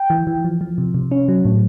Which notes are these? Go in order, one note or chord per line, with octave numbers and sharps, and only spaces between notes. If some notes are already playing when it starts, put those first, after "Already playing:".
Already playing: G5
E3
E3
F3
F3
C3
C3
C#4
F#3
A2